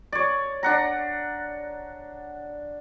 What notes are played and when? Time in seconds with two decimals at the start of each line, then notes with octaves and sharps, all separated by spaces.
0.12 C#5 D5
0.63 D4 F#5 A#5